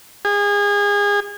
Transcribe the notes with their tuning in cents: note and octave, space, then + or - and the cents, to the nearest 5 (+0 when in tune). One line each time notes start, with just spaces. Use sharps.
G#4 -30